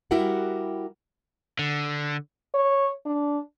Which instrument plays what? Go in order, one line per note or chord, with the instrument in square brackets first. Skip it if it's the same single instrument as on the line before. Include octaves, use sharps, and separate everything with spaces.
[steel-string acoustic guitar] G3 E4 F#4 G4 A#4 F#5
[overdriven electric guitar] D3
[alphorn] C#5
D4